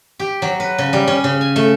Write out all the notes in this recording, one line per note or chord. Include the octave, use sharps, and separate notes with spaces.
G4
F#3
B4
C#3
G3
C#4
C#3
G#5
A3